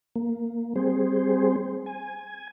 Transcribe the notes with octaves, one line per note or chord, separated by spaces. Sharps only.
A#3
G3 C4 G#4 C5
G#5